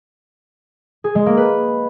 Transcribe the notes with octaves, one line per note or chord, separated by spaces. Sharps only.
G#4
G#3
A#3
B4